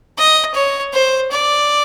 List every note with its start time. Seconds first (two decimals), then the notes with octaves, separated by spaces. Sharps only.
0.18 D#5
0.55 C#5
0.94 C5
1.32 D5